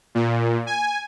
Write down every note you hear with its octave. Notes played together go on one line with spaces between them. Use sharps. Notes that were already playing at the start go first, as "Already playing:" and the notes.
A#2
G#5